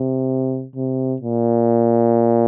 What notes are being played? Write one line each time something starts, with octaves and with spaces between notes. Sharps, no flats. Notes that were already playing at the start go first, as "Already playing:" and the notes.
Already playing: C3
C3
A#2